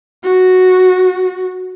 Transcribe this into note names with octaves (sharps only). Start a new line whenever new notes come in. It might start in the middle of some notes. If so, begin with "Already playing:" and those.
F#4